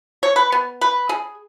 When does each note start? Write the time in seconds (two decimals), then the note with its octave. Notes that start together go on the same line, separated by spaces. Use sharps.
0.23 C#5
0.36 B4
0.52 B3
0.81 B4
1.09 G#4